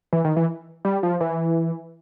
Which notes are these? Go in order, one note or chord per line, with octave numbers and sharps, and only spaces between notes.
E3
D#3
E3
G3
F3
E3